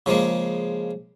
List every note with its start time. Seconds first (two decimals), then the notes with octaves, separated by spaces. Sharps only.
0.06 C#3 F3 G#3 A#3